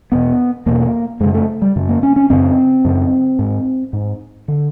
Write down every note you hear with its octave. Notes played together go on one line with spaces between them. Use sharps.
E2 B2 B3
E2 B2 A#3
F#2 C#3 G#3
A3
G3
F#2 C#3
A#3
C#4
C#4
F#2 C#3 C4
F#2 C#3
G#2
G#2
D3